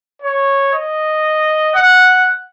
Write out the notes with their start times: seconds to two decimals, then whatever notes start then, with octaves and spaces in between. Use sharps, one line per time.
0.22 C#5
0.73 D#5
1.75 F#5